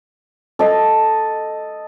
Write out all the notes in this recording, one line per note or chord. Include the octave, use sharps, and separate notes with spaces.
A4 D#5